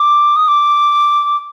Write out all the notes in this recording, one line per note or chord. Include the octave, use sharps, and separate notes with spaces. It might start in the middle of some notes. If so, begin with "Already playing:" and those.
Already playing: D6
D#6
D6